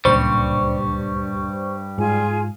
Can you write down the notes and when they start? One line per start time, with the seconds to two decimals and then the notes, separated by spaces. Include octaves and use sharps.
0.05 D1 C#2 G2 A#2 G3 C5 C#6
1.98 G#2 F4 G#4 G#5